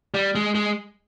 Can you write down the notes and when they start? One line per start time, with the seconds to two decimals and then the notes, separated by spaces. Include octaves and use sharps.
0.14 G3
0.35 G#3
0.55 G#3